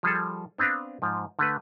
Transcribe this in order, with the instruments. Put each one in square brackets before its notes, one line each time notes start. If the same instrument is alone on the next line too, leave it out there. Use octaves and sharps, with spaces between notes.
[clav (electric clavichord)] F3 G3 G#4 A4
B3 C4 D4 B4 F5
G#2 F3
D3 A3 B4